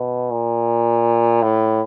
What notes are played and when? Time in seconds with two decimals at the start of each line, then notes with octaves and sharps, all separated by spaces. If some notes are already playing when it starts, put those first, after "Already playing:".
Already playing: B2
0.31 A#2
1.42 A2